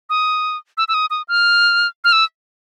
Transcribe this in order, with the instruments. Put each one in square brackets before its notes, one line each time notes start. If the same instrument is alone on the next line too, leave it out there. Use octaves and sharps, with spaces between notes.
[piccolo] D#6
E6
E6
D#6
D#6
F6
F6
E6